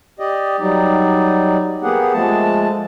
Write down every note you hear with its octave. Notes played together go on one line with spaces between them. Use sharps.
G4 D5 D#5
F#3 G3 D#4 D5
A#3 B3 G4 G#4 F#5
F3 G#3 A3 A5